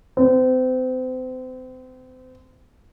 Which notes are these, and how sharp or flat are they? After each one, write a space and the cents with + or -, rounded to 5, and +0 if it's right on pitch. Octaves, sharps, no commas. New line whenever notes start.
C4 -35